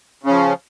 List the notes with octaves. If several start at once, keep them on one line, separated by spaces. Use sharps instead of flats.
C#3 F3 C#4